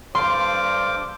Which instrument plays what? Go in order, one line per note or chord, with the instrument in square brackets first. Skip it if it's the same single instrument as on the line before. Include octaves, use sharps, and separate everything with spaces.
[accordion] G2 D6 [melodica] A4 D5 F5 [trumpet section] C5 [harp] C6